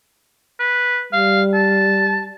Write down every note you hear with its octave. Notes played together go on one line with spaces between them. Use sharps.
B4
G3 F5
A5